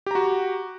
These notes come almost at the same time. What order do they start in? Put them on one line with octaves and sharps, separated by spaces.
G4 A#5 F#4